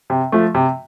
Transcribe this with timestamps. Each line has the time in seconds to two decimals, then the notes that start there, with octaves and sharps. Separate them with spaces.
0.10 C3
0.32 F3 A3
0.55 C3